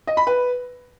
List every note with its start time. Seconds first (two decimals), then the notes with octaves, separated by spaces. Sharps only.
0.07 D#5
0.17 B5
0.27 B4